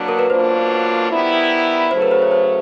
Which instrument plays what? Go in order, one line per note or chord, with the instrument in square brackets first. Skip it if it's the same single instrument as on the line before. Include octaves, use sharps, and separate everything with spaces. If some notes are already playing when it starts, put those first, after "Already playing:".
Already playing: [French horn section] B2 F#3 A#3 D4
[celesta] A#4
B4
[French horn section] B2 F#3 A#3 D4 F4 [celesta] C5
[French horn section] D#3 G3 B3 E4
[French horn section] C#3 F#3 A3 [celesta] C5
[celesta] B4
C5
C#5
C5